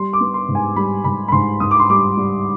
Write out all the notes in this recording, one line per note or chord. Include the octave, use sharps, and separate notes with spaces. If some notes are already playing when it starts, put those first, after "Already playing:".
Already playing: G3 C6
D6
B3
C6
G#2
G#5
G3 B5
G#2 B5
B5
G#2 C6
G#2 D#6
D6
C6
G3 D6
G3